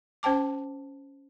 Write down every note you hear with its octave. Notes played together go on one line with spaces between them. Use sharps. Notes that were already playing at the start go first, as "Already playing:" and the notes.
C#4 C5 G5 A5 D6